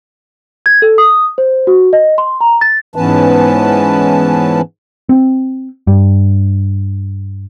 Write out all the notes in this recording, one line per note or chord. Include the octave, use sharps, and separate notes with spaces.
G#6
A4
D#6
C5
F#4
D#5
C6
A#5
A6
G#2 E3 B3 C#4 B4 A5
C4
G2